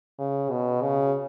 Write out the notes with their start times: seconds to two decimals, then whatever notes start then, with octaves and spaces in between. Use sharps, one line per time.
0.19 C#3
0.50 B2
0.81 C#3